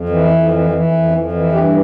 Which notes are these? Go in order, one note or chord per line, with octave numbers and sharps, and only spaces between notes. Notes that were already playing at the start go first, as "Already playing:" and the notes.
Already playing: F2
E3
F2
E3
E3
F2
F2
E3
G2 G4